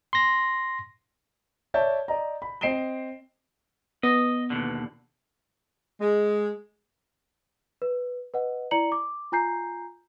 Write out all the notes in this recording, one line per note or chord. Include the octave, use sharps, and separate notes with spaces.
C6 A#6
C#5 D5 E5 A5 G6
D5 D#5 A#5
B5
C4 D#5 C7 D7 E7 G7
B3 D#5
D#2 B2 D3
G#3
B4
B4 D#5 F#5
E4 D5 A#5 C#7 F#7
D6
F4 G#5 A#5 G6 C7